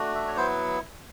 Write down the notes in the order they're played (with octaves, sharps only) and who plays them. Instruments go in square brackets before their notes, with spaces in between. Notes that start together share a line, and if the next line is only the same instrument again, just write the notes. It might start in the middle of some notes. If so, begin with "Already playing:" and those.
Already playing: [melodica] A3 D4 F#4
E5
C#5
F#3 B3 E4 C5